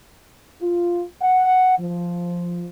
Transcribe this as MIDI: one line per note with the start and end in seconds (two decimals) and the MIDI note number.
0.62 1.03 65
1.22 1.76 78
1.78 2.65 53